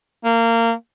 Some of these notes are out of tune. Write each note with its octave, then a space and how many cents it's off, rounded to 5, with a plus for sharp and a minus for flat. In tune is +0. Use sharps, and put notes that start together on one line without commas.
A#3 -25